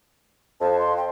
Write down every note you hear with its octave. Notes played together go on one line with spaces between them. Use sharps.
F2 F3 A5
C6
G5